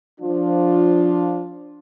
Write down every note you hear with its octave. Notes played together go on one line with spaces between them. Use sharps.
F3 D4 F4